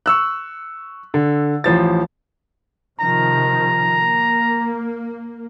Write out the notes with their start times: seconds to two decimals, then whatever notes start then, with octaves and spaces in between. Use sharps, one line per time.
0.06 C#6 E6 F#6
1.14 D3
1.64 A1 F3 A6
3.00 C3 D#3 F3 A#5
3.98 A#3